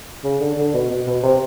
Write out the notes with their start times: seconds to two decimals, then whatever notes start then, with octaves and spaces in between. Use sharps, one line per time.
0.24 C#3
0.41 D3
0.58 D3
0.74 B2
0.90 B2
1.07 B2
1.23 C3